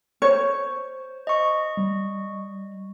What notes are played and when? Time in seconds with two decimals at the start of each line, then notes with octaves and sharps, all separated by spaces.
0.22 C5 C#5
1.27 D#5 C#6
1.77 G3